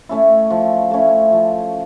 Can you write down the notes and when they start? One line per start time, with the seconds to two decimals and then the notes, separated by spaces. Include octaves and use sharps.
0.09 A3 C#4 E4
0.50 F3
0.91 A3 C#4 E4
1.32 F3